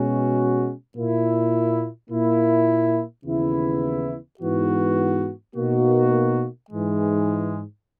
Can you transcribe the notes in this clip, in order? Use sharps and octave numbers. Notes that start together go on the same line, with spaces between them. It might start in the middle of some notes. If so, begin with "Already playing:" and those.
Already playing: B2 G#3 C#4 F#4
A#2 A#3 E4
A#2 A#3 E4
D#2 C#3 E3 B3 E4
G#2 E3 B3 F#4
B2 A#3 D#4 F#4
G#2 E3 G#3